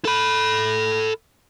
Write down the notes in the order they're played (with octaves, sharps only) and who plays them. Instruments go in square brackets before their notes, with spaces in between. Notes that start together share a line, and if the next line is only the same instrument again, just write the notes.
[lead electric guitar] A4 B5